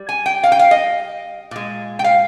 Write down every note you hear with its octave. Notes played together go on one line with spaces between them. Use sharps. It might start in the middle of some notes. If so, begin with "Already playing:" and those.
Already playing: G3
G#5
G5
F5
G5
F5
D#5
A#2 G#3
G5
F5